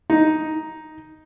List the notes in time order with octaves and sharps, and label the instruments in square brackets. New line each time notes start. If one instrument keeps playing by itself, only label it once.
[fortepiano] D#4